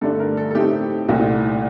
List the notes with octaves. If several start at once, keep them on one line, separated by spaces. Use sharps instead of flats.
G2 D3 A3 D4 A4
A#4
A4
A4
A2 A3 C4 D#4 G4
C2 A#2 A3 D#4